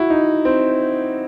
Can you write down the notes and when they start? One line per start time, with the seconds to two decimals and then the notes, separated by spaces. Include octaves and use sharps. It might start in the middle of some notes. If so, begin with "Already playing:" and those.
Already playing: E4 F#4
0.10 D#4
0.45 C4